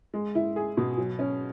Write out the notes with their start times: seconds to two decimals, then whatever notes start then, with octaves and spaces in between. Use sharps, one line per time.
0.14 G#3
0.35 E4
0.56 G#4
0.77 B2
0.98 F#3
1.19 C#4